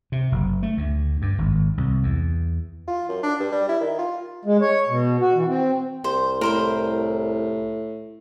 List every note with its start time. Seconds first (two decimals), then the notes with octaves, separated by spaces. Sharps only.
0.12 C3
0.32 F#1
0.63 A3
0.77 D2
1.22 G2
1.38 G#1
1.77 C2
2.03 E2
2.88 F4
3.09 F#2
3.23 D4
3.40 G2
3.52 G3
3.69 E4
3.80 D#3
3.99 F4
4.45 G#3
4.62 C#5
4.89 B2
5.20 F#4
5.34 E3
5.47 C4
6.04 C2 C5
6.41 A2 A#4 C5 B5